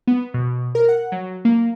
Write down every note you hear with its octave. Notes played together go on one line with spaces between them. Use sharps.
B3
B2
A#4
F#5
F#3
A#3